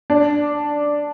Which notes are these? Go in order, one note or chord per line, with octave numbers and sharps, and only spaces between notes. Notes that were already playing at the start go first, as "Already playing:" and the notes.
D4